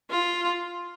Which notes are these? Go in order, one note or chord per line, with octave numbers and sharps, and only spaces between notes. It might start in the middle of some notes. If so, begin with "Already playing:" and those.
F4